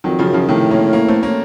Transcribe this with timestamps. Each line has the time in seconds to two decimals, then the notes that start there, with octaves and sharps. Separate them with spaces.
0.04 F2 D#3 F#3
0.19 C#3 F3
0.26 F#2
0.33 C#3 F3
0.49 A2 C3 D#3
0.71 A#3 C#4
0.93 A#3 C#4
1.08 A3 C4
1.23 A#3 C#4